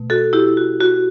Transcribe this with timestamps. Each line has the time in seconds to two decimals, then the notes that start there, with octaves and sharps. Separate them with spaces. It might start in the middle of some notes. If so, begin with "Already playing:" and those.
Already playing: B2 A3
0.10 F#4 A4
0.33 E4 G4
0.57 F#4
0.81 F#4